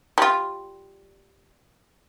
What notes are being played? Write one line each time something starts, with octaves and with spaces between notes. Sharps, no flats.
G3 F4